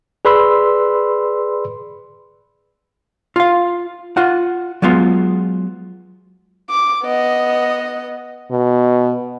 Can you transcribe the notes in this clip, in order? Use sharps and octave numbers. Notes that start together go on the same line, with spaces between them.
G#4 B4 D5 B5 C6 E6
F4 F5
F4 F#5
F#3 G#3 B3 F4
D6
B3 D#5
B2